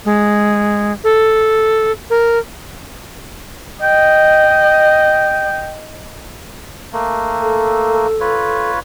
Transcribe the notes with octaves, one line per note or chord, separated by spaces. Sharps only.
G#3
A4
A#4
D#5 G5
A3 A#3
A4
F4 B4 C#5